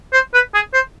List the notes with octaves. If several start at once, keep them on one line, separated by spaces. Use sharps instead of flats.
C5
B4
G#4
C5